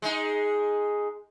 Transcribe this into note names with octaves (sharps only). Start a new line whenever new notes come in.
G#3 D#4